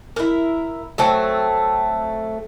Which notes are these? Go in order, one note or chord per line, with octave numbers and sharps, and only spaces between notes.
E4 A#4
F#3 A3 C4